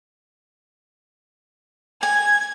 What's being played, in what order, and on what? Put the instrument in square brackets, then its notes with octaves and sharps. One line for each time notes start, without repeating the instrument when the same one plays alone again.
[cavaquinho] G#5 [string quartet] G#6